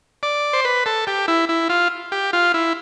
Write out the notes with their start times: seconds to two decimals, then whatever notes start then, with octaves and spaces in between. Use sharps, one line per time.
0.23 D5
0.53 C5
0.65 B4
0.86 A4
1.07 G4
1.28 E4
1.49 E4
1.69 F4
2.12 G4
2.33 F4
2.54 E4